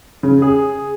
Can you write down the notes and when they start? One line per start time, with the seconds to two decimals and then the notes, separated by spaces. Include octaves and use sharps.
0.23 C#3
0.42 G#4